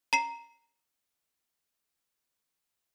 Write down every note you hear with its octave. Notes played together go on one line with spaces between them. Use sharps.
A#5 C7 E7